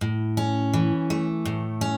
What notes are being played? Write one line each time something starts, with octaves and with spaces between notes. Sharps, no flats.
A2
C#4
E3
A3
A2
C#4